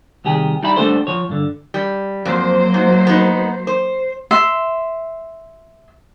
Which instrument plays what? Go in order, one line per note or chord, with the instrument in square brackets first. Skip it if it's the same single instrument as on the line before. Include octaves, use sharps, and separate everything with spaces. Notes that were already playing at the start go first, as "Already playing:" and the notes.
[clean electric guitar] C2 D#3 G4 G#4
G3 D#4 G4 E5 B5
G3 A3 D4 G#4 A4 C5
F3 C#5
G2 D3
[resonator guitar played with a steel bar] G3
[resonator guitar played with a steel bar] F2 [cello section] F#3 A#3 C5
[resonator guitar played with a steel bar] G#2
B3 D#4
C5
[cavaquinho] E5 C6